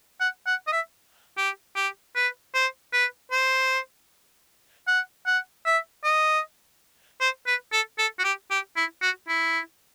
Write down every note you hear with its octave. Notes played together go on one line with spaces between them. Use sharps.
F#5
F#5
D#5
E5
G4
G4
B4
C5
B4
C5
F#5
F#5
E5
D#5
C5
B4
A4
A4
F#4
G4
G4
E4
F#4
E4